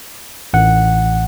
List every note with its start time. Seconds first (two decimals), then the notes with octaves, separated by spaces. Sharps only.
0.54 A1 F#5